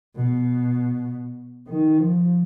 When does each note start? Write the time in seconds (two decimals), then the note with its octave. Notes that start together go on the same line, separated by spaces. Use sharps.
0.16 B2
1.68 D#3
1.98 F3